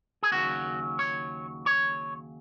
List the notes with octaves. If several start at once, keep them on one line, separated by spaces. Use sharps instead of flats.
G#4
D#2 C#3 F#3 F#4
C#5
C#5